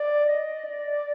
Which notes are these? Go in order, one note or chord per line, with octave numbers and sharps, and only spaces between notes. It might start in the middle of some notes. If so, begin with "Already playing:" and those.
Already playing: D5
D#5
D5